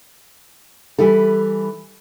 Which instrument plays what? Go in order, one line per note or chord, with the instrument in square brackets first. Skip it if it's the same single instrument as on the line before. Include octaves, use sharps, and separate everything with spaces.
[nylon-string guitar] E3 G3 E4 A4